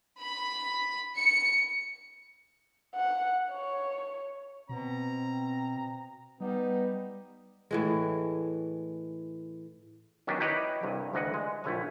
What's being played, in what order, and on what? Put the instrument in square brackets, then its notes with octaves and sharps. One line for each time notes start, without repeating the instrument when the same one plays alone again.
[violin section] B5
C#7
[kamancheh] F#5
C#5
[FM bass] B2 [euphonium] C4 [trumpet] A#5
[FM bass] G3 [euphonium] B3 [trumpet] D#4
[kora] A2 E3 G#3
[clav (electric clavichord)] D#3 F#3 B3 C#4 D4
D#4 E4 G4 B4 C#5 D#5
C2 G2
D2 E3 D#5 F#5
G#3
A#1 A3 E4 C#5 G#5